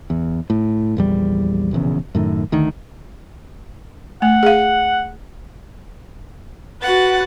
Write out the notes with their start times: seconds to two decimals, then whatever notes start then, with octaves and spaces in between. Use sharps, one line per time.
0.10 E2
0.50 A2
0.97 A#1 E2 G3
1.71 E1 A#1 E2 C#3
2.15 F#2 A2 D#3
2.52 D2 D#3
4.22 A3 F#5
4.43 G#4 F5
6.82 F#4 B4 F#5 A6